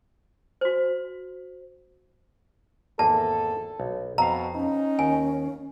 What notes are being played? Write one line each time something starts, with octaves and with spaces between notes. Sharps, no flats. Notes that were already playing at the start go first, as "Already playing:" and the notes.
F#4 C5
G#1 E2 A#3 A4 A5
B1
F2 B2 F5 A#5
C#4 D#4
D#2 G#5